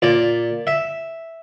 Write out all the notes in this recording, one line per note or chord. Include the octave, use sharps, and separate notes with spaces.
A#2 D5
E5